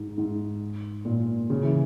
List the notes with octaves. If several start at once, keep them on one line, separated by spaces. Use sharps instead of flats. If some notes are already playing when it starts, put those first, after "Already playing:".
Already playing: G#2
G#2
A#2
C#3
E3